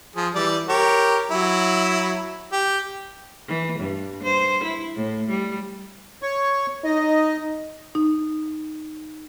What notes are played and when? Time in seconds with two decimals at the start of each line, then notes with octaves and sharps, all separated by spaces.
0.16 F3 G#4
0.35 E3 G3 D5
0.69 G4 A#4 C#5
1.31 F#3 E4
2.52 G4
3.48 E3
3.79 G2
4.23 C5
4.64 E4
4.96 A2
5.30 G3
6.22 C#5 C#6
6.85 D#4 D#5
7.95 D#4